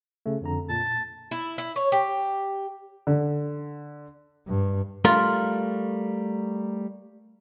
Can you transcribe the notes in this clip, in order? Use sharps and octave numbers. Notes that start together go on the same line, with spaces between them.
C#3 A3
F2 D3 A#5
A#2 A5
E4
E4
C#5
G4
D3
G2
G3 A3 F4 A#4